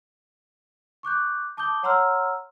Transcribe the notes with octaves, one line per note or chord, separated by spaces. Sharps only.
C#6 D6 F#6 G6
A5 D6 D#6 G6 G7
C#5 F#5 A#5 C6 E6 F6